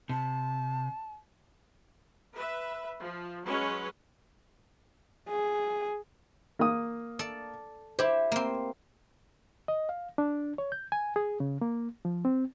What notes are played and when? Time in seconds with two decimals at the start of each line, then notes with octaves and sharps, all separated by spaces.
0.09 C3 A5
2.34 B4 E5
3.03 F3
3.45 F#3 G#3 C#4 B4 C#5
5.28 G#4
6.59 A#3 D#6
7.19 A4 D5
7.99 E4 G4 C5
8.32 A#3 C4
9.68 D#5
9.89 F5
10.18 D4
10.58 C#5
10.72 G6
10.92 G#5
11.16 G#4
11.40 C#3
11.61 A#3
12.05 F3
12.25 C4